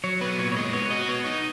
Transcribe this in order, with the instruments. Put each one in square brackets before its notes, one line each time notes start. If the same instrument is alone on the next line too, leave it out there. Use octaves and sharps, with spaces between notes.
[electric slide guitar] F#3 [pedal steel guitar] C#5
[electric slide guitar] B3 [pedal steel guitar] B4
[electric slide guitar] A#2 [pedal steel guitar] C#5
[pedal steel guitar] C#5
[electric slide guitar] G#3 [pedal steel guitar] D#5
[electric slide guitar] B3 [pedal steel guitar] C#5
[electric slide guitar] F#4 [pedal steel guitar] D#5
[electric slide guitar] B3 [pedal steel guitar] C#5
[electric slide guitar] D#4 [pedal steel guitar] D#5